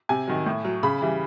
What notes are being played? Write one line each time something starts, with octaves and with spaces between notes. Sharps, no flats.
C3 G#5
D#3 F#3
A2
F#3
C#3 B5
E3 G3